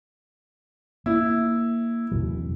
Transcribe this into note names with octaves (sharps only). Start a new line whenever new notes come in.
A#3 E4
E2 C3 F#3